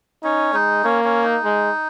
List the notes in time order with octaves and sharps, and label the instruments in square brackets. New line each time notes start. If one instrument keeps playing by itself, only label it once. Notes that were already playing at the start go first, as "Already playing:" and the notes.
[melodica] C#4 [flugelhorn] D#4
[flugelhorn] G#3 [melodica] D#4
[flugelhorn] A#3 [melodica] C#4
[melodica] C#4
D#4
[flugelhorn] G#3